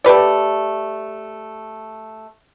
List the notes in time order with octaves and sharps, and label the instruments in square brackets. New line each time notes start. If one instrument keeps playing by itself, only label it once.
[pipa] A3 G4 B4 D5